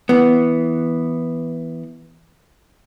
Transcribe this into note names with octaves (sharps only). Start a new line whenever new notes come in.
E3 B3